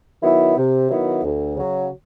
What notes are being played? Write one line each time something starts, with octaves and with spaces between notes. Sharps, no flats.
D#3 F#3 B3 E4
C3
D#3 F#3 B3 E4
D2
C#3 F#3